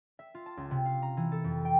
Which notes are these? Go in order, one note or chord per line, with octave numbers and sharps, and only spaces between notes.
E5
F4
A5
C#2
C3
F5
A#5
E3
A4
F2
G5